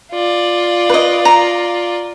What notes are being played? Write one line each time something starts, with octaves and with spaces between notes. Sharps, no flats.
F4 D5
B4 D#5
A#5